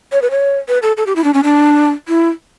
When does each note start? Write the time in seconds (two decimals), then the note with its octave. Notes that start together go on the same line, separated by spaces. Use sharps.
0.12 C#5
0.22 B4
0.31 C#5
0.68 B4
0.83 A4
0.97 A4
1.07 G4
1.16 E4
1.24 D4
1.34 C#4
1.44 D4
2.09 E4